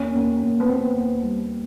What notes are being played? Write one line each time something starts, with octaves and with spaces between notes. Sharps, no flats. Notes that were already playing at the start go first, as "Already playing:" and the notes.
Already playing: D#2 C#4
D#2
D#2
B3
D#2 C4
D#2
G3